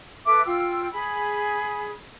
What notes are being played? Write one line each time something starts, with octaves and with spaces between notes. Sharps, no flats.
A4 B4 E5 D6
F4 G5 E6
G#4 B5